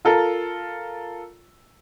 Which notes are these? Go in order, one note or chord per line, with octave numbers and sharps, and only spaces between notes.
F4 A4 A#4